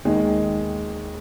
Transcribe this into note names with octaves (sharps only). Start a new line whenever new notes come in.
D#2 D#3 G#3